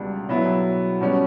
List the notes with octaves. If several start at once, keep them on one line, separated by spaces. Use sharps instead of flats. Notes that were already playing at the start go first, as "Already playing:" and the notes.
Already playing: C#2 B2 G3 D4
B2 F#3 B3 E4
B2 G3 C#4